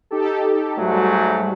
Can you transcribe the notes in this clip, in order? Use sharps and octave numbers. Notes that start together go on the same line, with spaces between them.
D#4 G4 A4
G#2 F#3 G3 A3 F#4